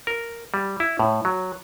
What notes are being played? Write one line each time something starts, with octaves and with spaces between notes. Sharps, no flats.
A#4
G3
E4
A2
F#3